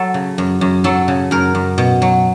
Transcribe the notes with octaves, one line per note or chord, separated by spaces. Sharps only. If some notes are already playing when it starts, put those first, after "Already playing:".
Already playing: F#3 A4
C#3
F#2
F#2
F#3 A4
C#3
F#2 A#4
F#2
B2
F#3